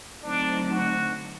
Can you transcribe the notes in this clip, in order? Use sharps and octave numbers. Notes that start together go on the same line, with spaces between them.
D3 F#3 A3 C4 D4 D#4
F#4